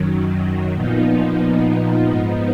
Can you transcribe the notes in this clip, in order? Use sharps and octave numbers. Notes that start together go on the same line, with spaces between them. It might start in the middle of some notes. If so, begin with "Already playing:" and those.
Already playing: F#2 D#3 F#3
A#2 F3 B3 D#4
G#2 F3 B3 D#4